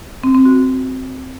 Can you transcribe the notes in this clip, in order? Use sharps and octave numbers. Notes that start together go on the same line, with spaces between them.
C4
C4
F#4